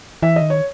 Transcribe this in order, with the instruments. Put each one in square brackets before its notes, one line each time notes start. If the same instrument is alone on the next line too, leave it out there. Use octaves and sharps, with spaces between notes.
[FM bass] E3 [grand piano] E5
[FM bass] D#3 [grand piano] D#5
[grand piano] C#5